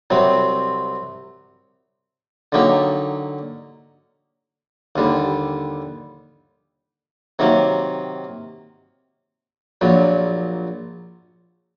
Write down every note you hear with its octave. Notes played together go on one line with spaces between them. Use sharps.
C2 C3 F#3 C4
D3 F#3 A#3 D#4 G4
D#2 D3 G3
C3 D#3 F#3 A#3
A#1 A#2 F#3